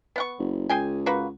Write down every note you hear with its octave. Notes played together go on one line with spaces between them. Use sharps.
B3 F#5 C#6
F#1
C#2 G#4 G5 G#5
A#3 F#4 B4